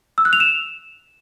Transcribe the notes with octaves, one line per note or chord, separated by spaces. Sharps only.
E6
F#6
F7
E7